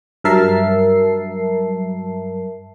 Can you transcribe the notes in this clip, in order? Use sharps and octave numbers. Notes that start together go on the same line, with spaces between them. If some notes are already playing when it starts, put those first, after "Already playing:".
G2 F#3 A#4 E5 A5 C7